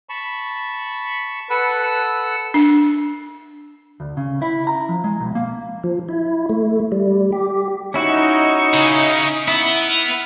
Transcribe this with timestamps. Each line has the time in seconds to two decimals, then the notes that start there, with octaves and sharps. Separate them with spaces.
0.09 A5 B5 C#6
1.50 A4 B4 F#5 E6
2.54 D4
4.00 D2
4.17 C#3
4.42 E4
4.67 A#5
4.89 F3
5.04 G#3
5.20 B1
5.35 A#3
5.84 F3
6.09 E4
6.49 A3
6.92 G3
7.32 G4
7.94 C#4 D#4 E4 F#4 C#6
8.74 C#3
9.48 B3 E4
9.88 F6